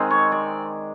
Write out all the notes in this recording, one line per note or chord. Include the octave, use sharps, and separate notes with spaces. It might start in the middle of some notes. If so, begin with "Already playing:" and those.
Already playing: D#3 G#3 C4
C#5
D5